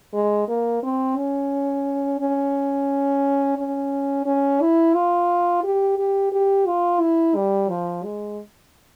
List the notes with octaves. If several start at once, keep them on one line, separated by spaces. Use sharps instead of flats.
G#3
A#3
C4
C#4
C#4
C#4
C#4
E4
F4
G4
G4
G4
F4
E4
G3
F3
G#3